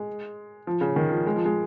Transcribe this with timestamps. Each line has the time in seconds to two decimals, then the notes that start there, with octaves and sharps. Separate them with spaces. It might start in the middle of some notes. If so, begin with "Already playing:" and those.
Already playing: G#3
0.67 F3
0.81 C#3
0.96 D#3
1.11 F3
1.27 G#3
1.36 F3
1.45 G#3